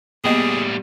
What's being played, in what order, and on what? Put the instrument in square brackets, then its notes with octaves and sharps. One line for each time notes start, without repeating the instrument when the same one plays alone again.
[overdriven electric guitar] A2 G3 [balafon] A#3 B3 D#5 [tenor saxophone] G#4